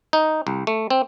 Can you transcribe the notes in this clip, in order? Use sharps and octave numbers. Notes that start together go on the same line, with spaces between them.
D#4
C2
A3
C4